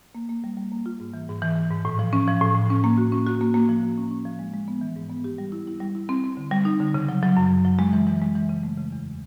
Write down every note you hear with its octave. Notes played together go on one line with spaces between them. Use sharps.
A#3
A#3
G3
G3
A#3
F4
G#2
E3
G#2
E3
E3
G#2
A2
F3
C#4
F3
A2
A2
C#4
A#3
F#4
C#4
F#4
A#3
A#3
F3
A#3
C#4
C#4
F3
G#3
G#3
B3
E3
G#2
B3
G4
G3
E4
E4
G3
E4
C4
C4
D3
G3
D#4
D3
C#3
F#3
F#3
F#2
F#2
F#3
G#3
E3
E3
G#3
E3
C#3
A3
C#3
E2